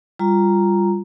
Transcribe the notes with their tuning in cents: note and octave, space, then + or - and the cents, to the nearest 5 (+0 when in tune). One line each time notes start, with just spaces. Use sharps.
G3 +10 F4 +0 A#5 +0